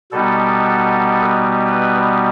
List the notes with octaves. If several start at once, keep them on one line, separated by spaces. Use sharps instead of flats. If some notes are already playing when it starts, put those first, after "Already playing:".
B2 G3 B3 D#4 A4
B4